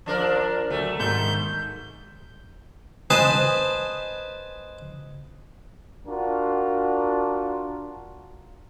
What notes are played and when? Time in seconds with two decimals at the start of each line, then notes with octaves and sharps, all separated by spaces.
0.06 F3 D4 A#4
0.70 D2 F#3 A3
1.00 G#2 D#3 G6
3.10 B4 C5 D#5 G#5 A5
6.06 D4 F4 F#4 A#4